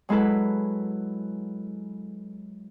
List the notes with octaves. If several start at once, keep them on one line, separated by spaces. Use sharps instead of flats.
F#3 G#3 E4 A4 B4